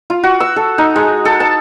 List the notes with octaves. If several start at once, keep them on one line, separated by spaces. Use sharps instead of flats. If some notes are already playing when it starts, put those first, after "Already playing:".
F4
F#4
E6
A4
D#4
G#3
A4
A5